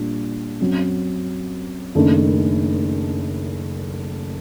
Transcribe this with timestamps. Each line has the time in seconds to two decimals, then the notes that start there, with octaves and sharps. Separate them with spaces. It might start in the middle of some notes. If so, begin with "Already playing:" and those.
Already playing: A#2 G3 D4
0.60 F#2 F#3 C4
1.95 F#1 F#2 D#3 A3 D4